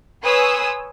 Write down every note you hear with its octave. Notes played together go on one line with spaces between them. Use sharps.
B4 C#5 G#5 C6 D#6 E6